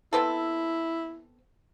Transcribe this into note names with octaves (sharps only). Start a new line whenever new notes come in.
B3 C4 E4 A4